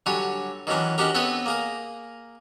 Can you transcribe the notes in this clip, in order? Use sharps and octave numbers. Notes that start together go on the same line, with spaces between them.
D3 F#3 G3 C#5 G#5
D#3 E3 F#3 C#4 D4
G#3 C#4 D4 F#4 G4 A#4
B3 C4 A4 B4 C#5 D#5
A#3 G#4 A#4